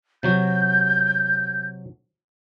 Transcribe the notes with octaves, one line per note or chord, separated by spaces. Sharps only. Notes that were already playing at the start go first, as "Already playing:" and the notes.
C3 F#3 F#4 G6